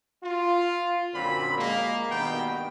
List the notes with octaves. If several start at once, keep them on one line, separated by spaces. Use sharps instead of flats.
F4
F#2 A#2 D3 C4 B5
G#3 A#3
G2 B2 D#3 B3 G5